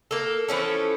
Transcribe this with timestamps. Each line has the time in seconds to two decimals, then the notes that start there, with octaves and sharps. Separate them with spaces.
0.11 A#3 A4
0.48 E3 F3 C#4 A4